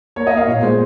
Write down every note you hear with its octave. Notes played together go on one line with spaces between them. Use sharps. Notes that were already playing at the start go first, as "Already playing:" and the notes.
A#3 C#5
D#5
A#3
F5
A#2 C#5
G#3 C5